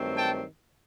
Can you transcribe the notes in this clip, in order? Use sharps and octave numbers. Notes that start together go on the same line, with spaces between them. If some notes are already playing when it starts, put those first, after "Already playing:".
Already playing: G2 D#3 F#3 A3 C4
G5 A5